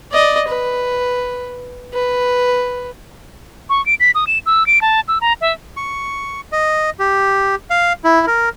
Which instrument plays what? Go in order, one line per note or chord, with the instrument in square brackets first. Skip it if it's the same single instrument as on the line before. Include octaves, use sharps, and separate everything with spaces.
[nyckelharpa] D5 D#5
B4
B4
[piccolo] C#6
D7
B6
D#6
E7
E6
D7
A5
E6
A#5
E5
[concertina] C#6
D#5
G4
F5
E4
A#4